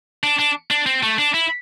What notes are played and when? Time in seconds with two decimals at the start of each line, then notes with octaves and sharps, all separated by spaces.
0.23 D4
0.39 D4
0.71 D4
0.86 C4
1.03 A3
1.18 D4
1.34 E4